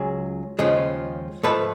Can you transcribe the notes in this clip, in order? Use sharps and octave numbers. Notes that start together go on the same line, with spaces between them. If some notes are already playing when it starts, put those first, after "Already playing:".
Already playing: C#2 F#3 G#4
D#2 C#3 F3 G#3
G#2 F3 A3 A4 B4